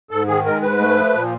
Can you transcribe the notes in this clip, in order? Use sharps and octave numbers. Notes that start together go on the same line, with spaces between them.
G#2 A4
D#3 G#4
G#3 A#4
G#2 B4
A3
F3
A#2